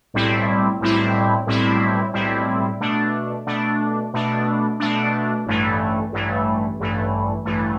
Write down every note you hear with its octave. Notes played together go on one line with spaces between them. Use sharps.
B1 A2 G3 C4 E4
B1 A2 G3 C4 E4
B1 A2 G3 C4 E4
B1 A2 G3 C4 E4
B2 A3 D4
B2 A3 D4
B2 A3 D4
B2 A3 D4
A1 G2 E3 A3
A1 G2 E3 A3
A1 G2 E3 A3
A1 G2 E3 A3